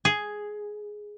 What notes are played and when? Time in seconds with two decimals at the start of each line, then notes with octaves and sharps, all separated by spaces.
0.05 G#4